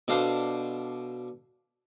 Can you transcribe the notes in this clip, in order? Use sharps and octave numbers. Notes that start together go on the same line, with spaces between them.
B2 D4 A4 C5 F5